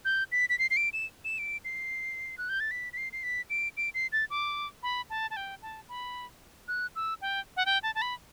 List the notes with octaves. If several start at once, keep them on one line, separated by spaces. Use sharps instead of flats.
G6
B6
B6
C7
C7
D7
E7
E7
D7
C7
F#6
G6
A6
B6
B6
C7
C7
B6
D7
D7
C7
A6
D6
B5
A5
A5
G5
A5
B5
F#6
E6
G5
F#5
G5
A5
A5
B5